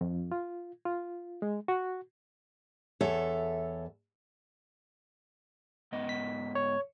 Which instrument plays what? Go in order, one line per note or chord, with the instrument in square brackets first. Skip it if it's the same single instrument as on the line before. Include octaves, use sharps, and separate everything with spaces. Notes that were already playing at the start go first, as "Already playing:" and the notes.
[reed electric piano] F2
F4
F4
G#3
F#4
[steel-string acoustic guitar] E2 A4 C#5 E5
[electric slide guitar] G#2 B3 D#5
[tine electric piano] B6
C#5